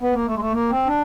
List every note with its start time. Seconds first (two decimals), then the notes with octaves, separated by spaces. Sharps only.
0.01 B3
0.13 A#3
0.26 A3
0.35 G#3
0.39 A3
0.53 A#3
0.70 C4
0.86 D4